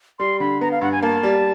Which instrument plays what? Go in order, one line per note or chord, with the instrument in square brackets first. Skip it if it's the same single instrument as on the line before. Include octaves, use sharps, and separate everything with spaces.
[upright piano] G3 [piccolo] C6
[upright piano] D3 [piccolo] B5
[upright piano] B3 [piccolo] A#5
[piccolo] F5
[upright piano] G2 [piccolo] F#5
[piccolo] G#5
[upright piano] A#3 [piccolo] A5
[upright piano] G3